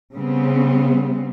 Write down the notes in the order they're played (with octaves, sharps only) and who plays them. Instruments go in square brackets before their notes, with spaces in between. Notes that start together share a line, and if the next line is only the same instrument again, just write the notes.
[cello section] C#3 G3 B3 C4